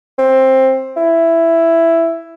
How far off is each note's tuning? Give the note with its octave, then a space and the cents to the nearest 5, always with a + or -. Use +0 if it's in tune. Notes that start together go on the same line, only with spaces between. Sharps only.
C4 +15
E4 +10